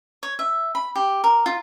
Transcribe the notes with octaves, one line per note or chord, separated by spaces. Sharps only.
C#5
E5
B5
G4
A#4
F4